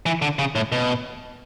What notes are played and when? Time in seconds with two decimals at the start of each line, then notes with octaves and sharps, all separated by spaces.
0.06 E3
0.22 D3
0.39 C#3
0.55 A2
0.72 B2